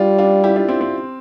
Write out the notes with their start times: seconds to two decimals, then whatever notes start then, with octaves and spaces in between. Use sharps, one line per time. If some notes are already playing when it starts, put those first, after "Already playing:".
Already playing: G3 D4 F4
0.18 D4 F4
0.44 E4 G4
0.56 D4 F4
0.68 C4 E4
0.81 C4